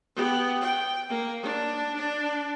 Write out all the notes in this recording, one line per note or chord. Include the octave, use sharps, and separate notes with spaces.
B3 G4
G5
A#3
D4
D4